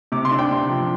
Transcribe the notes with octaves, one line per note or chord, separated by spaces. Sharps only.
C3 D6
C6
D4
G5
C3
F3